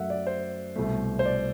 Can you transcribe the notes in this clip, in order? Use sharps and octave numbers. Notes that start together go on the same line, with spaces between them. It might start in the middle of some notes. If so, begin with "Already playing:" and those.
Already playing: F#2 F#3 A3 E5 F#5
D5
C5
C2 B2 A3
C5
D5